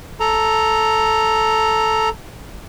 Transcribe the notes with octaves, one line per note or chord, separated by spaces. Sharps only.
A4 A#5